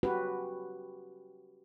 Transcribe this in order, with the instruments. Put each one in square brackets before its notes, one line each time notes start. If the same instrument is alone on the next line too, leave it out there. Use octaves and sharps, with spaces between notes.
[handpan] C#4 F#4 G4 B4